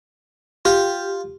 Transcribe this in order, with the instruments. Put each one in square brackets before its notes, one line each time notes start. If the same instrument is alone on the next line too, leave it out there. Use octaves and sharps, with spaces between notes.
[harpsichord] F4 [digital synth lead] G4